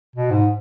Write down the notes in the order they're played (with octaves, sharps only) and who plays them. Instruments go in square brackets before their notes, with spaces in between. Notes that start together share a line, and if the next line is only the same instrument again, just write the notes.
[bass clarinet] B2
G#2